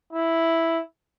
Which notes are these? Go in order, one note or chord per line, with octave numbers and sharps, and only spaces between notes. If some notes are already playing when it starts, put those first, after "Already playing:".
E4